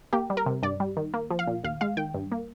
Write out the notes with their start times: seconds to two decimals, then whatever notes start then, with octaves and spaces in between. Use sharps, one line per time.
0.13 A#3 G4
0.30 G3
0.37 A#4
0.46 C3
0.62 G2 D5
0.80 G3
0.97 D#3
1.14 A#3
1.30 F3
1.39 F5
1.47 A#2
1.64 D#2 F5
1.81 G#3 F5
1.97 D#3 G5
2.14 G2
2.32 A#3